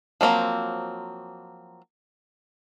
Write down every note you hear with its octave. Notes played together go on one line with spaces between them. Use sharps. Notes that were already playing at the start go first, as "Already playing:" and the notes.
F3 F#3 A#3 C4